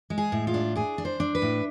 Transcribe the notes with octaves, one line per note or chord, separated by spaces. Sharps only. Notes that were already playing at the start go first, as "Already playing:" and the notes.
G#3
G#4
A2
F4
D4
D4 G#4
D4
C5
D4
B4
A2